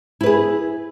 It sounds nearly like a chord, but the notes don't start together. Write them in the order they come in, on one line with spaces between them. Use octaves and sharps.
E4 B4 G#4